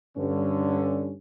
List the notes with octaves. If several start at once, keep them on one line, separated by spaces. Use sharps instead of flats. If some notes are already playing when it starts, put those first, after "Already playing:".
G2 D3 C#4